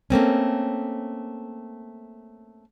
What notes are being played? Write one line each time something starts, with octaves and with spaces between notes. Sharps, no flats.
A3 A#3 C4 C#4